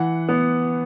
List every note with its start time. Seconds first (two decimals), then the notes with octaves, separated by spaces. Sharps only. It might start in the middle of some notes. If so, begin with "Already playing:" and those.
Already playing: E3 F#5
0.29 B3